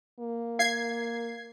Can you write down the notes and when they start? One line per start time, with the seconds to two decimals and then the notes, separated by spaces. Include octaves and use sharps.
0.20 A#3
0.59 F5 G#6 C7